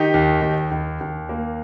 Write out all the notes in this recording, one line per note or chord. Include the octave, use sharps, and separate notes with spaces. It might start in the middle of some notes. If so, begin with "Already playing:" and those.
Already playing: D#3 D#4 G4
D#2
D#2
D#2
D#2
A#3